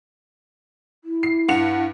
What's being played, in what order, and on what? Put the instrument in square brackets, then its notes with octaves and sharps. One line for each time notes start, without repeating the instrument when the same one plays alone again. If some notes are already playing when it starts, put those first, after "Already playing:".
[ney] E4
[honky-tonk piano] C7
G2 F#5 F7